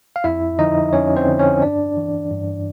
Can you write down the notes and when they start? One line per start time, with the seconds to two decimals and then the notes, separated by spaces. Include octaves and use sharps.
0.16 F5
0.24 F2 E4 E5
0.59 D3 F3 D#4 D#5
0.93 F2 C#4 C#5
1.16 C4 C5
1.28 D3 F3
1.39 C#4 C#5
1.62 G2 D4 D5
1.97 E3
2.31 G2